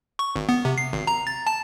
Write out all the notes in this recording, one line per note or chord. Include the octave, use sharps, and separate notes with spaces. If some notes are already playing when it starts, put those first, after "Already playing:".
C#6
G#1
B3
C3
C7
G#1
A#5
A6
A5